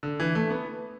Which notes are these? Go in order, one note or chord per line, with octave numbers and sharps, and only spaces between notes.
D3
E3
A3
B3